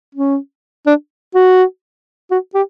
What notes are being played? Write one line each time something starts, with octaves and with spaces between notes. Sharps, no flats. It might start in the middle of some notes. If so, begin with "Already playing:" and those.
C#4
D4
F#4
F#4
G4